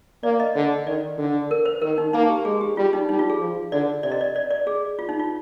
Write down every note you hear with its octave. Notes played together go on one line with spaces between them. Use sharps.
A#3 D5
D#5
D3
D#3 D5
D3
A#4
C5
D#3 A#4
D#4
A#3 D#4
G4
G#3 G#4
G4
G3 F4
D#4
G3 D#4
F4
G#4
F3
D3 D5
C3 D5
D#5
D5
D5
D5
G#4
F4
D#4
F4